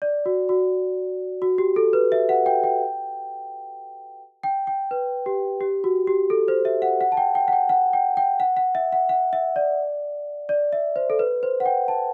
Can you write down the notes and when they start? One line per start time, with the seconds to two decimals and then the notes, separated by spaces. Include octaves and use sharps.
0.02 D5
0.26 F#4
0.49 F#4
1.42 F#4
1.58 G4
1.76 A4
1.93 B4
2.12 E5
2.29 F#5
2.46 G5
2.64 G5
4.44 G5
4.67 G5
4.91 B4
5.26 G4
5.61 G4
5.84 F#4
6.07 G4
6.30 A4
6.48 C5
6.65 E5
6.82 F#5
7.01 F#5
7.12 A5
7.17 G5
7.35 G5
7.48 F#5
7.53 G5
7.69 F#5
7.93 G5
8.17 G5
8.40 F#5
8.57 F#5
8.75 E5
8.92 F#5
9.09 F#5
9.33 E5
9.56 D5
10.49 D5
10.73 E5
10.96 C5
11.10 A4
11.19 B4
11.43 C5
11.60 F#5
11.66 G5
11.88 A5